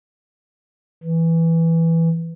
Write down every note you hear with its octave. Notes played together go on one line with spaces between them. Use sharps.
E3